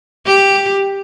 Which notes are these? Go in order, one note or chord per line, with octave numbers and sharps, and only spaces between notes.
G4